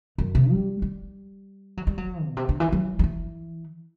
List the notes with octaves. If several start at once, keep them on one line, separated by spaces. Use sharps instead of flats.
F#2
C3
G3
G3
F#3
G3
F#3
B2
C3
D3
E3
F#3
F#3
E3